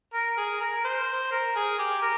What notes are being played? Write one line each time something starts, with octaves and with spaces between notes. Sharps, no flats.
A#4
G#4
A#4
C5
A#4
G#4
G4
A#4